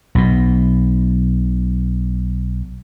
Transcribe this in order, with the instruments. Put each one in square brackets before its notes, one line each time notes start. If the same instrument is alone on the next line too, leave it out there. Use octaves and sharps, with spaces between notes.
[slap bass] B1 B2